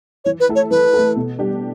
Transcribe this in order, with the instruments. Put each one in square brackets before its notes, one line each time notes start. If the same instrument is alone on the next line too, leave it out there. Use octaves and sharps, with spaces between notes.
[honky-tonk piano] E3 [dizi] C#5
[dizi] B4
[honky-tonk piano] A3 E4 A4
[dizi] C#5
[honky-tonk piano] E3 [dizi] B4
[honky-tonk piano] A3 E4 A4
B2
G3 D4 G4